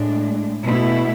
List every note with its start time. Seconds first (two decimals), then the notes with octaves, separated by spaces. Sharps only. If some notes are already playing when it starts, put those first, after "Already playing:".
Already playing: A2 G#3 D4
0.64 B2 A3 E4